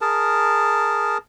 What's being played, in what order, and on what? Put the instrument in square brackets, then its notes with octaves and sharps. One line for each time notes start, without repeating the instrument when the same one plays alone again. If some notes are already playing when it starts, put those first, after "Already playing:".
[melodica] G#4 A#4 A5